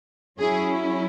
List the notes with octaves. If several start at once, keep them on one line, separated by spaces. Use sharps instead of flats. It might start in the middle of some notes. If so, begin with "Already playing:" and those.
F#3 C#4 E4 G#4